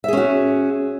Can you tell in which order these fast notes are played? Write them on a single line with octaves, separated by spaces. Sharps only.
E5 G#4 C#4 F#4